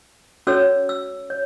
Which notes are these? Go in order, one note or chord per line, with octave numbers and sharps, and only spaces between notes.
C#4 F#4 A4 C#5 E6
E6
C#5